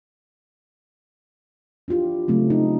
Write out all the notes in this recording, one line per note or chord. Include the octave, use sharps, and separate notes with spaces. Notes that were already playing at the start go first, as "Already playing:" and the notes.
D4 E4 F4 G4
C#3 F#3 A3 C4
D#4